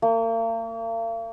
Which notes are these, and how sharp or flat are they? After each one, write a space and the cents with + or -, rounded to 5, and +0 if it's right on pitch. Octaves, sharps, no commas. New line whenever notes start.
A#3 -40